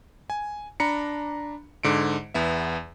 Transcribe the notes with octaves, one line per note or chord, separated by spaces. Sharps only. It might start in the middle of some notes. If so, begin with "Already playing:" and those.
G#5
D4 A#5 B5 C#7
G#2 D3 C#7 D7
E2 B3 E5